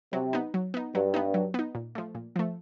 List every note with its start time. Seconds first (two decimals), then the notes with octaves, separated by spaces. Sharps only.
0.13 C3 F#3
0.33 B3 D#4
0.54 F#3
0.74 B3 D#4
0.95 G2 F#3
1.14 B3 D#4
1.34 F#3
1.54 B3 D#4
1.75 A#2
1.95 F3 A3
2.15 A#2
2.36 F3 A3